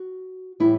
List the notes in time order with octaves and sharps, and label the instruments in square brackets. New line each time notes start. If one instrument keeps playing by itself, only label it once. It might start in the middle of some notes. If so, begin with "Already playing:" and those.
Already playing: [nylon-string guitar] F#4
A2 E3 G3 E4